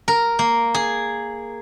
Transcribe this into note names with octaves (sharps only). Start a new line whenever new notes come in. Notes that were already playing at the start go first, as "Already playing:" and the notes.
A#4
A#3
G#4